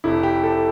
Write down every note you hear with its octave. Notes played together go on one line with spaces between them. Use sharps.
F1 F2 C3 E4
G4
A4